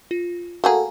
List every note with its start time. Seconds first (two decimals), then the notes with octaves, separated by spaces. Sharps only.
0.11 F4
0.64 A3 A#3 F#4 G#4 A4 F5 F#5 A#5